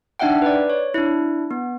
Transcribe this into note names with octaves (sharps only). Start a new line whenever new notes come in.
D4 D#4 E5 F#5 G5
B4 D5
C#5
D4 E4
B3